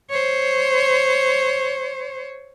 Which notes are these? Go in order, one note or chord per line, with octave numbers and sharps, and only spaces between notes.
C5 C#5